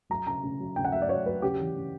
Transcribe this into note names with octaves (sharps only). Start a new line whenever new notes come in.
F#3 A#5
C#3 A#5
C#3
F#3
C#3 G5
F#5
F#3 E5
D5
F#3 C#5
F#3 B4
C#3 G4
E3
C#3